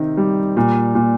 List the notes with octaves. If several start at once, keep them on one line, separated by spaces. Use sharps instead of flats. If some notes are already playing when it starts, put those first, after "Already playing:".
Already playing: C3 D#3 C4
G3
A#2
A#2